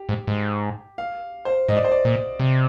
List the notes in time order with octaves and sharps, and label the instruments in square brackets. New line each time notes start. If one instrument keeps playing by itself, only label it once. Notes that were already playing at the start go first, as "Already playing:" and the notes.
Already playing: [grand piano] G4
[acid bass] G#2
G#2
[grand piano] F5
C5
[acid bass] G#2 [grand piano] D#5
[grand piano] D5
C5
D5
[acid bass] A#2
C3